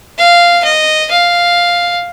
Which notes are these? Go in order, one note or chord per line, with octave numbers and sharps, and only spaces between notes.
F5
D#5
F5